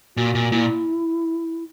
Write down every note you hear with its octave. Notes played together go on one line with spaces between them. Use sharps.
A#2 F#4
A#2
A#2 E4